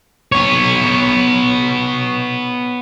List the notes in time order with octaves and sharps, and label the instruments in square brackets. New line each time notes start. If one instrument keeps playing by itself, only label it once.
[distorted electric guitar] B3 C#5